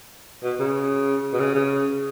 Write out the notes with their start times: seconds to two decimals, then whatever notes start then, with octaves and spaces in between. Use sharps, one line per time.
0.43 B2
0.59 C#3
1.33 B2
1.39 C#3
1.55 C#3